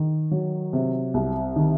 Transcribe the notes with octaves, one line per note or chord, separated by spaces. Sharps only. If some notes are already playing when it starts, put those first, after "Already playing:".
Already playing: D#3
F#3
C3
C2
D#3